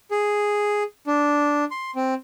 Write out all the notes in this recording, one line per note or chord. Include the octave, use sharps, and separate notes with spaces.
G#4
D4
C6
C4